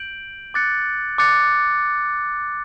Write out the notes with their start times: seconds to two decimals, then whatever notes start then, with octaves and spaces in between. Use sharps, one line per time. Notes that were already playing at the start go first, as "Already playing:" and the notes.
Already playing: G6 D7 F#7
0.54 D6 F#6 A6 C#7
1.18 D6 F#6 A6 C#7